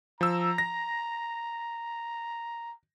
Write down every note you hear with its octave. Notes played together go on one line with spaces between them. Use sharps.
F3 A#5 E6
A#6